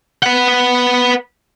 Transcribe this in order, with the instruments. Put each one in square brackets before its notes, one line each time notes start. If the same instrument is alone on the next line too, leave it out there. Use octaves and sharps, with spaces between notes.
[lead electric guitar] B4 F#5